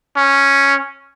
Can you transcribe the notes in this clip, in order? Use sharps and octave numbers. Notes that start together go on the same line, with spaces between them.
C#4